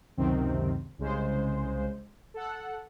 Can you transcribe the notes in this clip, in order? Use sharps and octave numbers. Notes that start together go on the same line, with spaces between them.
C#2 F#2 C3 D#3 C4
C2 C#3 G#3 C5
A4 F#5